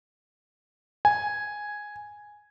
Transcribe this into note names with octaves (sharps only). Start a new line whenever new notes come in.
G#5